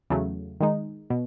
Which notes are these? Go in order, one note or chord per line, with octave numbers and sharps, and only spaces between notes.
E2 C#3 F#3 A3
D#3 G#3 D#4
B2